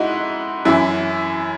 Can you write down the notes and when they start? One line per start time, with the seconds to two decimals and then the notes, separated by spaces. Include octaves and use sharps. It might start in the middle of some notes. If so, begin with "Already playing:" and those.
Already playing: G#2 D#4 E4 F#4
0.65 F#2 E3 E4